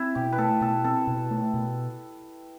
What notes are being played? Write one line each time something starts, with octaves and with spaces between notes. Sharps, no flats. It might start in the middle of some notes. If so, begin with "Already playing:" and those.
Already playing: C4 E4
B2 G4
B4
A3 A4
B2 A4
C4 A4
B2
A3
B2